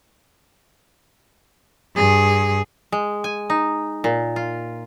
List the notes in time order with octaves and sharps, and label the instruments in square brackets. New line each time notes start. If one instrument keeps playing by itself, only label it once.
[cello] G2 G#4
[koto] G#3
G#5
D#4
A#2
F4